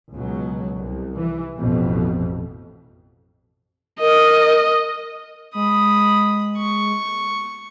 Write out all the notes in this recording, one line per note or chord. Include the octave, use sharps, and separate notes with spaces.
C#2 B2 F#3
C2
E3
A1 F2 B2
A#4 D#5
G#3 B5 D#6
C#6